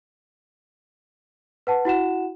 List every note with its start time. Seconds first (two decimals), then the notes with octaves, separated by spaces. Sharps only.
1.67 B4 F#5 A5
1.85 E4 F#4 F#5 E7